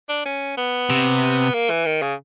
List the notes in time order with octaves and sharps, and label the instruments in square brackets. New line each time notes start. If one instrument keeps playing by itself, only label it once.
[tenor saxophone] D4
C#4
B3
[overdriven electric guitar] C3
[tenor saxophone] A#3
E3
D#3
C#3